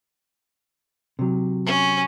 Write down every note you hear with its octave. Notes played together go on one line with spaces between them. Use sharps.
C3 F#3
C#4